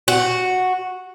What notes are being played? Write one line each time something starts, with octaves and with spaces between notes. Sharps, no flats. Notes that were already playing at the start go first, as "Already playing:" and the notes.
F#4